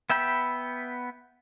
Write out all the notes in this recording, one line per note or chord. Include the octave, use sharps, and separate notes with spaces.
B3 E5 G5 B5